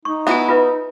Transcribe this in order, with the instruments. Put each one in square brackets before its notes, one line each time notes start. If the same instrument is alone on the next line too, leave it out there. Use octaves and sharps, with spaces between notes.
[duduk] D#4 [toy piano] C#6
[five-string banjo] B3 E4 F#4 [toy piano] E5 G#5
[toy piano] F4 B4 E5